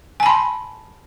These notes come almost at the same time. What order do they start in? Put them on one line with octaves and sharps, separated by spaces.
G#5 A5 B5 C6